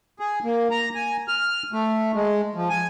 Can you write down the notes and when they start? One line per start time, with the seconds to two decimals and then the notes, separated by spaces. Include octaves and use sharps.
0.20 G#4
0.44 A#3
0.71 A#5
0.95 G#5
1.28 F6
1.73 A3
2.15 G#3
2.55 F3
2.69 G#5